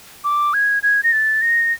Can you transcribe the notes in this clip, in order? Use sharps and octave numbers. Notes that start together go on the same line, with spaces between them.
D6
G#6
G#6
A#6
A6
A#6